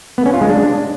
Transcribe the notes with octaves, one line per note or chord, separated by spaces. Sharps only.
B3
C#4
F4
G#3
D4